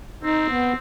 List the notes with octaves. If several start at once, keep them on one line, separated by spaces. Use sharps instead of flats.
C4 D#4
B3